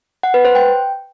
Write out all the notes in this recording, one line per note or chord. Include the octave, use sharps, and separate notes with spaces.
F#5
B4
C5
G5